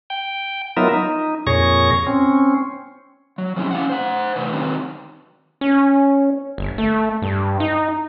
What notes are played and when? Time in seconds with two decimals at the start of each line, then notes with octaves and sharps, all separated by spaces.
0.10 G5
0.77 F#3 B3 D#4 F4 A#4 E5
0.94 D#4
1.47 F2 A#2 G#4 C#5 C#6 A#6
2.07 C4 C#4
3.38 F#3
3.56 F3 G3 C4 C#4 E4
3.71 C#4 F5 F#5
3.89 C5 F#5
4.36 C3 E3 A3 D4 B4
4.52 D#3 F#3 C4 D#4 B4
5.61 C#4
6.58 G1
6.78 A3
7.22 G2
7.60 D#4